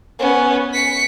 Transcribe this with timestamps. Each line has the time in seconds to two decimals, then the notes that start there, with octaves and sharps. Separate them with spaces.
0.19 B3 C#4
0.73 B6 C#7